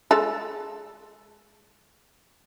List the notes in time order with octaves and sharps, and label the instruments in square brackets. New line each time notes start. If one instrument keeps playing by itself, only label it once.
[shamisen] G#3 A4